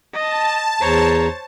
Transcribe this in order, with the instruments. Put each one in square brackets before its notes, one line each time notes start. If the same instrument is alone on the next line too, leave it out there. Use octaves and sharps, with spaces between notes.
[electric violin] D#5 [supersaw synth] A5
[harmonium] E2 A#5 [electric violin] C5 C#5